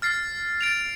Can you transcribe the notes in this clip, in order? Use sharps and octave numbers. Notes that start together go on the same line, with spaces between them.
F6 A6 C7
A6 D7 F7